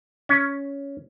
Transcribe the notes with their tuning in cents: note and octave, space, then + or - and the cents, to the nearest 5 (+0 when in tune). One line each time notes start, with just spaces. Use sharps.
C#4 +10